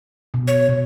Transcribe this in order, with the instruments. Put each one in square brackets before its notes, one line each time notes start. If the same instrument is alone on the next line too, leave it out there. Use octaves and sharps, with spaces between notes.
[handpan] B2
[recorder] C#5
[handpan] B2